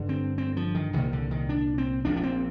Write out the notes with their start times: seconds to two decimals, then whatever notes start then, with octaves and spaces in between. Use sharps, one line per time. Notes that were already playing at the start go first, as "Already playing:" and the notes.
Already playing: G1 G2 D3
0.09 C4
0.38 C4
0.57 F3
0.75 D#3
0.93 C2 A#2 D#3
1.13 D3
1.31 D#3
1.49 D4
1.78 C4
2.05 A#1 A#2 D4
2.16 D4
2.23 C4